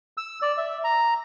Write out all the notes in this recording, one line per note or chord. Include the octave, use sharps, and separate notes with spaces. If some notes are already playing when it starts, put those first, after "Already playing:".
E6
D5
E5
A#5